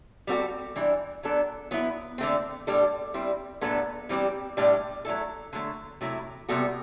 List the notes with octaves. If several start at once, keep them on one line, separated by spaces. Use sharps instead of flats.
G3 C4 F#4 A4
E3 G3 D4
F#3 B3 D4 A4
F#3 B3 E4
D3 A3 C4
A2 G3 D4 A4
G3 C4 E4
A2 F#3 B3 D4 A4
E3 G3 C4 G4
A2 G3 D4
F#3 A3 E4 A4
D3 F#3 A3
C3 F#3 A3 E4
C3 G3 B3 F#4 A4